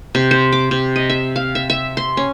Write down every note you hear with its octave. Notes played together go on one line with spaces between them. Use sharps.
C3
C5
D6
C3
D#5
E5
F5
E5
E5
C6
C#4